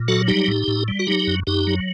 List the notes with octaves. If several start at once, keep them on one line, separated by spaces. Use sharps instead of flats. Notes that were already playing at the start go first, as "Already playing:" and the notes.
Already playing: A#2
F#3 F#4 A4
G3 D#4 G4
A2
A2
G3
F#4
F#3 D#4 G4
F#2
F#2 D#4 G4
F#3